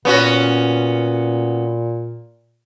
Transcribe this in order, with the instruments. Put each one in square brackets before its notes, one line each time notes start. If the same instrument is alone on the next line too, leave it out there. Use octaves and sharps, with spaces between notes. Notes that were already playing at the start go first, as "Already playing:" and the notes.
[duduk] A#2 [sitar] B3 C#4 F#4